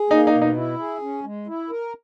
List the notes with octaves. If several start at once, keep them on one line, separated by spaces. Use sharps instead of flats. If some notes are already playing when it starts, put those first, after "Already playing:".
Already playing: G#4
A#3 D#4
D#4
B2
D#4
E4
G#4
C#4
G#3
E4
A#4